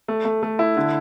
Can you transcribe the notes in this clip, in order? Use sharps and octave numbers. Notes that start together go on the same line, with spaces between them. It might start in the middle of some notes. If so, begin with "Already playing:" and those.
A3
A3
A3
E4
D3